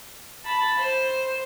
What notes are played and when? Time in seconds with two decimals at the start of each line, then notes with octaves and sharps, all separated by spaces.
0.45 A5 B5
0.79 C5